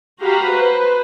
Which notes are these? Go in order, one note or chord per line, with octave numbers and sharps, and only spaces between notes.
F#4 G4 F5 A#5 B5
B4 C5